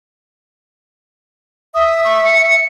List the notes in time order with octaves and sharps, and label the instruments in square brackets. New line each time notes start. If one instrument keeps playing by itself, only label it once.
[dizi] E5 [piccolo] D#6
[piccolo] C#6
C#7